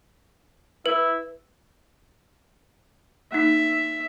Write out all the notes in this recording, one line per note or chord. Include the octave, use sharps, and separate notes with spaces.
E4 B4
A#3 D#4 E5